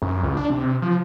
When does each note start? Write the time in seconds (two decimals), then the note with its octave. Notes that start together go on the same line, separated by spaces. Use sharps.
0.02 F#2
0.23 C#2
0.37 D4
0.50 C3
0.82 F3